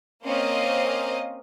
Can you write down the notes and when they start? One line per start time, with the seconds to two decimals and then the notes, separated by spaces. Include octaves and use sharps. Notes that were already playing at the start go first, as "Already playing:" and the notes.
0.24 A#3 C4 C#4 C5 D#5 F5